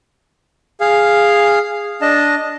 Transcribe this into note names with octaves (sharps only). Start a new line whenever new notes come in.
G#4 F5
D4 D#5 A5